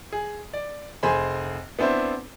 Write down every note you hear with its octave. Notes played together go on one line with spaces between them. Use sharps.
G#4
D5
F1 G#4 C5 G#5 B5
B3 C4 D4 E4 C5